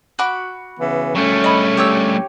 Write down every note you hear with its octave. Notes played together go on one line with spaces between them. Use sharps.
F#4 B5 D6
C#3 E3 B3
G2 A3 C#4
D#5 B5
G4 C#5 E6